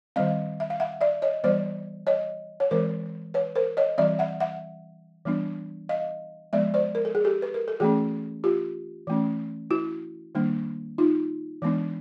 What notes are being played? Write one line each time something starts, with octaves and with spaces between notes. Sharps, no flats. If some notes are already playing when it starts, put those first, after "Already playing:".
D#3 G3 C4 D#5 F5
E5
F5
E5 F#5
D5 E5
C#5 D#5
E3 G3 B3 C5 D5
C#5 D#5
C#5
E3 G#3 C4 A#4 C5
B4 C#5
A#4 C5
C#5 D#5
E3 G3 C4 D5 E5
E5 F#5
E5 F#5
E3 G3 B3 D4
D#5 F5
F3 G#3 B3 D5 E5
C5 D5
A#4
A4
G#4
G4 A4
B4
A#4
A4
E3 A3 C#4 F#4 G#4
F4 G4
E3 A3 C#4
E4 F#4
D#3 G3 A#3 D4
D#4 F4
E3 G#3 B3 D4